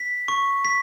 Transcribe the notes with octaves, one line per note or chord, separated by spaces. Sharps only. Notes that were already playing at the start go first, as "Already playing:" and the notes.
Already playing: B6
C#6
B6